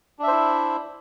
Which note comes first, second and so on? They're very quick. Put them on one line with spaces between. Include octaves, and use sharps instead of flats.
D4 E5 C5 E4